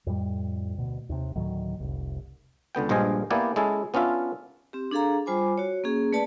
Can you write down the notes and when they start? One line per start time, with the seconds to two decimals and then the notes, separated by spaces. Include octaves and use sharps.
0.07 F2 A2 G3
0.77 D2 B2
1.09 D#2 C3
1.36 D2 A2 D#3 F#3
1.80 F1 C2
2.75 C#2 D3 B3 G5
2.89 A#1 G2 G#3 C5 D#5 G#5
3.30 A#3 B3 E4 G4 D5 G#5
3.56 G#3 C#4 E4 G#4 A4
3.94 B3 C#4 D4 F4 E5
4.73 C4 G4
4.91 D4 G#4 A4 F5 A#5
5.26 G3 F4 C5 G#5 B5 D6
5.58 F#4 C#5
5.84 A#3 C#4 G#4
6.13 A3 B4 D5 A5